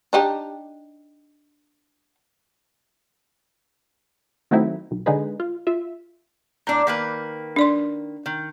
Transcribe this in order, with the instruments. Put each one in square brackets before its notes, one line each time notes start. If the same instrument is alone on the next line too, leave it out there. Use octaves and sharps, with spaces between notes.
[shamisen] D4 D#4 G4
[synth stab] D#3 F#3 A3 C4 D#4 E4
B1
D3 G#3 D#4 G#4 B4
F4
F4 E5
[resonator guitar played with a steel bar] A2 D4 [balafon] A#5
[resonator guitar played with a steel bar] D#3 A#3 B4
[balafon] D4 D5 C6
[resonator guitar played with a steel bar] D#3